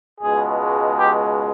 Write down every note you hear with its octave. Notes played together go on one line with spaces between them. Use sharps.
C#2 B2 G#3 G#4
G4